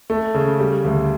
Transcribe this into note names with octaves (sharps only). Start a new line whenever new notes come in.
A3
C#3
G3
D2